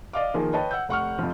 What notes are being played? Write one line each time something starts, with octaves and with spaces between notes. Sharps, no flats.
D5 D#5 F5 D6
D#3 F3 A#3 G#4
B4 C#5 D#5 G5 A5
F#5 E6 G6
F1 F#5 C#6 F6
F2 F3